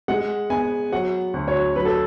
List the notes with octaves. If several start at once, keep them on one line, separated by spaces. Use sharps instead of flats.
G#3 F#5
B3 G#5
F#3 F#5
D2
C#5
F#3 B4
A4